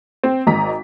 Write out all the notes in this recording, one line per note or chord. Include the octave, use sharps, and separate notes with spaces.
C4
G#1 D#5 A#5 B6